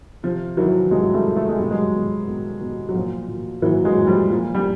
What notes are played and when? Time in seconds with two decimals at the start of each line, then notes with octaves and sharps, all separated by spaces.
0.23 C3 F3
0.57 D#3 E3 F#3
0.91 C3 F#3 G#3
1.14 G3 A3
1.25 D#3
1.36 A3
1.48 G#3
1.59 B2 G3
1.70 F#3 G#3
1.93 B2
2.27 B2
2.61 B2
2.89 F#3
2.95 A#2 F3
3.28 A#2
3.62 A#2 E3 F#3
3.85 F#3 G#3
3.97 A#2
4.07 F3 G3
4.30 A#2 F3
4.55 G3